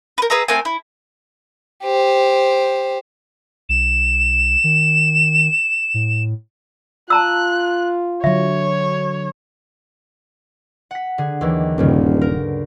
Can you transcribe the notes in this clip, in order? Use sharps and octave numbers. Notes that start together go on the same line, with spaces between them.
A#4 B4
G#4 B4 E5 A#5
A3 C4 A#4 G#5
E4
G4 C5
B1 E7
D#3
A2
F4 A5 A#5 E6 F#6
D3 F#3 C#5 E5
F#5 B6
D3 G#4
D#2 E3 F#3
D#1 D2 G2 C#3
A#4